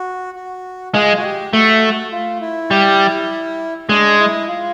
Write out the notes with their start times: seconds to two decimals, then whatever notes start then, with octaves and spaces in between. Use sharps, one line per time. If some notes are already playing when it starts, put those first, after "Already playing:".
Already playing: F#4
0.36 F#4
0.94 G#3 F4
1.17 F#4
1.23 G4
1.53 A3 F#4
2.12 F4
2.41 E4
2.71 G3
3.89 G#3 D4
4.19 E4
4.48 F4